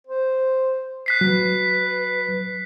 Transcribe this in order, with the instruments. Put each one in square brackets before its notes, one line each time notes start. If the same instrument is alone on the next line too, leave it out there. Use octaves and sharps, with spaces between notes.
[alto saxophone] C5
[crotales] F#6 B6 C7
[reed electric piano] F#3 [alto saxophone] B4